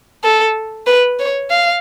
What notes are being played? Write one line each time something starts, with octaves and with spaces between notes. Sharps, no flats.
A4
B4
C#5
F5